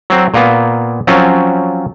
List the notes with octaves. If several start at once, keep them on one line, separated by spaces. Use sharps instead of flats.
F#3 C4
A#2 A#3 B3
F3 F#3 C4 C#4 F4